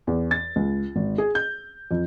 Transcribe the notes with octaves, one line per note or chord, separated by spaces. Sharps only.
E2
A6
C#2
G#1
G#4
G6
F2